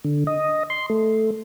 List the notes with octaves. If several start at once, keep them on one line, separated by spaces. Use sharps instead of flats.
D3
D#5
C6
A3